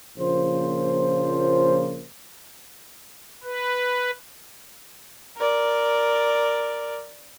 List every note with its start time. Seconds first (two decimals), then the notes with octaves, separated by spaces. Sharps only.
0.18 A#1 C#3 F3 A#3 C5
3.44 B4
5.37 A#4 D5